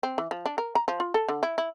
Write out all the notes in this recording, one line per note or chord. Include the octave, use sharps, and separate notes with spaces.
C4
E3
F3
D4
A#4
A#5
F3
F4
A4
D3
E4
E4